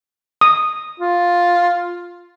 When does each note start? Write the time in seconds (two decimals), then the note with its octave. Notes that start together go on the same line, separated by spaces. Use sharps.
0.41 D#6
1.00 F4